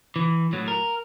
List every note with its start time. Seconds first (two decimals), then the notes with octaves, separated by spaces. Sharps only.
0.16 E3
0.53 A2 F#3
0.68 A#4